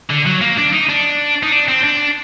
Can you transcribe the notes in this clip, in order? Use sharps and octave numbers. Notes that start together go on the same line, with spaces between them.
D3
F#3
A#3
D4
D#4
D4
D#4
D4
C4
D4